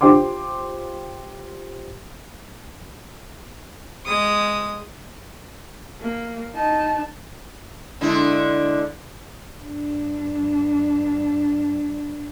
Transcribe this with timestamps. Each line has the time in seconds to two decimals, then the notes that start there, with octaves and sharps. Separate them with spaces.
0.01 F4 G4 C5 G5 C6 D6
4.06 G#3 D#6
6.00 A#3
6.55 D#4 A5
8.01 D3 G#3 E4
9.59 G2 D4